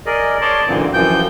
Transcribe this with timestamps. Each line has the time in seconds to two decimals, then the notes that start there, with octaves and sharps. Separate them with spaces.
0.06 G#4 A#4 D5 D#5
0.42 C#5 D5 A5 C6 D6
0.68 F#2 A#2 D3 E3 A#3 C4
0.93 F#2 E3 F3 G5 G6